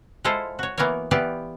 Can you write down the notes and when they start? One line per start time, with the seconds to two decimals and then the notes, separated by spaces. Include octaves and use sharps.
0.25 G#3 E4 F4 A4 C5
0.59 F#4 C#5
0.78 E3 A#3 B3 A#4 C#5
1.11 E3 B3 F4 G4 D5